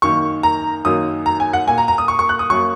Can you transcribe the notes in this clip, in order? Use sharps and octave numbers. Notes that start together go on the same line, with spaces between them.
F#2 D#3 A#3 C#6
A#5
F#2 D#3 F#3 A#3 D#6
A#5
G#5
F#5
A#2 A#3 G#5
A#5
A#5
D#6
C#6
C#6
F#6
D#6
F#2 F#3 A#3 C#6